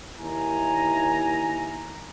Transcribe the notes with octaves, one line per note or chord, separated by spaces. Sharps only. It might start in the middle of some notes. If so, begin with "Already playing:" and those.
D#2 E4 G#5 A#5